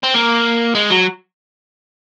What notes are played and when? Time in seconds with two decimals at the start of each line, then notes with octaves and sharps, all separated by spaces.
0.04 C4
0.14 A#3
0.75 G#3
0.90 F#3